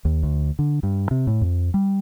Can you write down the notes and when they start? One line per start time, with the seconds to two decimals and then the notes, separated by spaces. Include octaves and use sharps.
0.05 D#2
0.23 D2
0.59 D3
0.83 G2
1.11 C3
1.27 A2
1.41 F2
1.74 G3